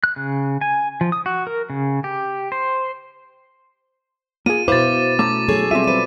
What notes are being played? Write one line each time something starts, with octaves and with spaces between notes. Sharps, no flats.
F#6
C#3
G#5
F3
D#6
F#4
A#4
C#3
G4
C5
A#3 F4 G#4 D#7
B2 E4 B4 C5 F5 D6 A6
A3 C#4 A#5 D6
F#3 C#4 G#4 A4 C#5
G3 C4 F4 G4 E5 D#7
B4 C5 D#7